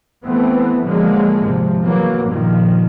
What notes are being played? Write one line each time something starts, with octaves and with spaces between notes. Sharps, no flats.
E3 A3 B3 C4
D3 F3 F#3 G#3 A#3
G#1 C3 F3
G#2 E3 F#3 A#3
G2 A#2 D#3 F3